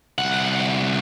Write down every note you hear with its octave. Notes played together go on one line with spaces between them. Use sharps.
C2 F#5